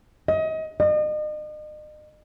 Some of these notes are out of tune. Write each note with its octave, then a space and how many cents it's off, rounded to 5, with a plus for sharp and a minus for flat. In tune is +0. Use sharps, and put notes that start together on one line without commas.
D#5 +30
D#5 -40